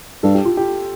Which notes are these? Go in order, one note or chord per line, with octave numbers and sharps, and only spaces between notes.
G2 A4
G4
F4
G4